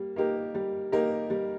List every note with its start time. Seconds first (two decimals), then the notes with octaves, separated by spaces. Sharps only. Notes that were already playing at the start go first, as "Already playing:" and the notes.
Already playing: G3 A#3
0.16 A#3 D#4 G4 A#4
0.55 G3
0.92 A#3 D#4 G4 A#4
1.30 G3